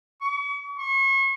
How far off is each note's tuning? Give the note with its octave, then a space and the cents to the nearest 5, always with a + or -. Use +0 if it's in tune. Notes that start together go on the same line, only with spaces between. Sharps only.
C#6 +40
C#6 -40